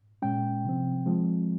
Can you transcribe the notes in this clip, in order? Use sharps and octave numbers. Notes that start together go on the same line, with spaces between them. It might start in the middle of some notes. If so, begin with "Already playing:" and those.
A#2 G#3 C#4 G5
C3 F3 C4
F3 G#3 C4